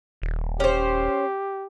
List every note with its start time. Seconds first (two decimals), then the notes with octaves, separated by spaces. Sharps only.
0.22 D#1
0.60 C#4 G4 C5